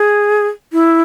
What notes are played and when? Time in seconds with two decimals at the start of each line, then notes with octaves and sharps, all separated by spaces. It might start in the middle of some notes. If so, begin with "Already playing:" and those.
Already playing: G#4
0.73 E4